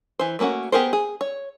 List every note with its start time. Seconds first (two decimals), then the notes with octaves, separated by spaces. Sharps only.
0.19 E3 C5
0.39 A3 A#3 C#4 F#4 F#5
0.72 B3 G4 G#4 A#4 C5
0.93 G#4
1.21 C#5